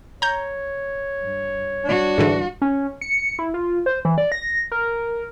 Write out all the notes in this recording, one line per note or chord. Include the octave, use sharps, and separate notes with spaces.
C#5 A#5 G6
G2
G3 D4 F#4
G#2 D3 E3
C#4
C#7
E4
F4
C5
E3
D5
A#6
A#4